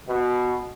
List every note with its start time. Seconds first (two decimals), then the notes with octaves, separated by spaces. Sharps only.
0.09 B2